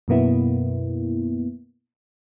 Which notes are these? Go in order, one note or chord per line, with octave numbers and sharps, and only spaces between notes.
F#2 B2 A#3 B3 E4